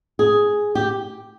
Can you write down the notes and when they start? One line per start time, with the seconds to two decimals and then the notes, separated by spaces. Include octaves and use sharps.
0.19 G#4
0.75 G4